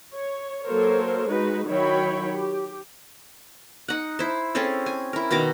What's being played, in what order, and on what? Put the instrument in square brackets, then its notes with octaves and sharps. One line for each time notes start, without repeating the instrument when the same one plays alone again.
[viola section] C#5
F#3 A#3 A4 A#4 C5 C#5
G#3 D#4 F#4 B4
D#3 F#3 E4 C#5 G5 B5
G4
[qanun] D#4 F#5
E4 C5
C4 C#4 G#4 A4
G#5
E4 A#4
B2 D#3 A#5 D6